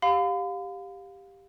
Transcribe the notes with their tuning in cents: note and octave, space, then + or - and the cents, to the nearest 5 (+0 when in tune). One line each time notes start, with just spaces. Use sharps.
G4 +5 F5 +25 B5 +45